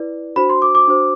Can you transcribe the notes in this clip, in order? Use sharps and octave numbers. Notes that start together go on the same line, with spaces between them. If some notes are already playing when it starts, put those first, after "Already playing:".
Already playing: E4 B4 D5
D4 F#4 C5 B5
C6
D6
D6
D4 F#4 C5